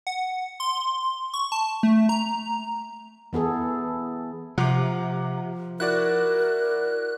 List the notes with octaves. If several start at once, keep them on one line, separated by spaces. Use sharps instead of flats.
F#5
C6
C#6
A5
A3
A#5
E3 B3 G#4 A4
C3 F3 F#5 A#5 D6
E4 F#4 A#4 D5 F#6